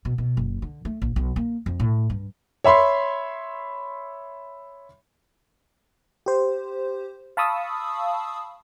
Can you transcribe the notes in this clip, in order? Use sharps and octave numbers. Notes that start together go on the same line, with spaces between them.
B2
B2
F#1
D3
A3
A#1
B1
A#3
F2
A2
G2
C#5 E5 B5 C6
G4 C5
F5 A5 B5 C#6 D#6 E6